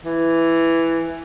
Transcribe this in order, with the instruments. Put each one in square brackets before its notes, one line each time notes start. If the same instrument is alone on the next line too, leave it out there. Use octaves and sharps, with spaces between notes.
[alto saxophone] E3